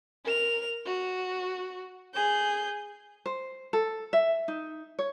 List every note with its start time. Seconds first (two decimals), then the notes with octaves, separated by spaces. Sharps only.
0.24 A#4 F7
0.86 F#4
2.14 G#4 G6
3.26 C5
3.73 A4
4.13 E5
4.48 D#4
4.99 C#5